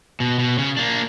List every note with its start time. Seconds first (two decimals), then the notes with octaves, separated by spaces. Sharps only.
0.20 B2
0.39 B2
0.58 C#3
0.77 A#3 D4